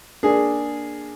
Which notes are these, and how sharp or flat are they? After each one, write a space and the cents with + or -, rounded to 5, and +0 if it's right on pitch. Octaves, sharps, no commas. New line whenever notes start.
A#3 +10 D4 +0 G#4 +0